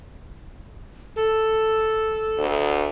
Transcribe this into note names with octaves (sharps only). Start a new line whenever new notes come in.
A4
D2